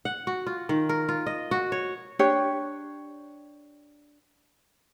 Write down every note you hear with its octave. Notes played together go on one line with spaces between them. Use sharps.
F#5
F#4
F4
D#3
A#4
F4
D#5
F#4
C#5
D4 G4 C#5